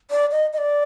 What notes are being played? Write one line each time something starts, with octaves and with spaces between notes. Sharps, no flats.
D5
D#5
D#5
D5